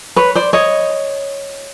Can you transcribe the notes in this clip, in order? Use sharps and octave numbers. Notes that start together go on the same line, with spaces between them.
B4 C#5
C5 D5
C#5 D#5